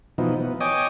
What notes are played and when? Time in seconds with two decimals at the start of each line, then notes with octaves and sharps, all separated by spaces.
0.18 B2 E3 F3 D#4
0.40 B3
0.61 C#5 D#5 G5 G#5 D6 D#6